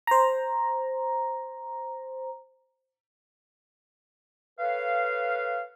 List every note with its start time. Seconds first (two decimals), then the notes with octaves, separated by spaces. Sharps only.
0.07 C5 A#5
4.59 A4 B4 C#5 F5